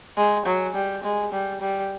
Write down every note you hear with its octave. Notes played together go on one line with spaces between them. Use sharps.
G#3
F#3
G3
G#3
G3
G3